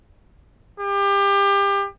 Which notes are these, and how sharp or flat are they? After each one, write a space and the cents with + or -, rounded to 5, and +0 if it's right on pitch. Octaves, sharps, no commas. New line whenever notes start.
G4 +30